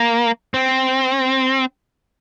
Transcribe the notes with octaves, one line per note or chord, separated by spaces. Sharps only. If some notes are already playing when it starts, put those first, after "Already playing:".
Already playing: A#3
C4